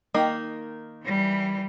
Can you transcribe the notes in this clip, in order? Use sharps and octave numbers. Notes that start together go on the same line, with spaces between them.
D#3 A#3 D#4
E3 G3